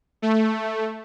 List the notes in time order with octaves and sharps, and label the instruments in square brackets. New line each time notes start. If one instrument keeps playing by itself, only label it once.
[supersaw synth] A3